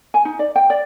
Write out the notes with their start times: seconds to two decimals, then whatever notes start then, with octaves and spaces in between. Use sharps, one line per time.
0.14 G#5
0.25 D#4
0.39 D5
0.56 G5
0.70 D5